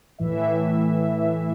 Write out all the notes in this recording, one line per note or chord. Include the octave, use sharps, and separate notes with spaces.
A2 E3 E5